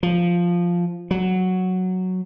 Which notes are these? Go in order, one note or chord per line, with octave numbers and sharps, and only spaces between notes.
F3
F#3